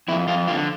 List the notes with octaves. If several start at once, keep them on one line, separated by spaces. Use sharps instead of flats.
F2 E4
F2 F4
D3 F4